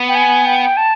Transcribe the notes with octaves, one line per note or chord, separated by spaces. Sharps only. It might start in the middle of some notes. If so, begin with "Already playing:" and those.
Already playing: B3
G5
G#5
G5
A5